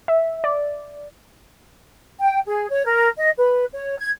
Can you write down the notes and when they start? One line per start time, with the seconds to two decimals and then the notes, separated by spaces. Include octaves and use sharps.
0.08 E5
0.44 D5
2.21 G5
2.46 G#4
2.70 C#5
2.87 A#4
3.18 D#5
3.38 B4
3.73 C#5
3.99 G#6